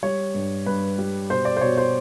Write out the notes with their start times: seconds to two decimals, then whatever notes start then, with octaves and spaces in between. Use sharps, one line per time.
0.03 G3 C#5
0.34 G2
0.66 G2 B4
0.98 G3
1.30 B2 C5
1.45 D5
1.57 C5
1.61 B2 C#5
1.78 C5